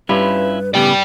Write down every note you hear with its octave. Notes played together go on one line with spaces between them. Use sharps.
G2 C#4 E4 F4 B4
A2 C#3 B3 G4 D5 G5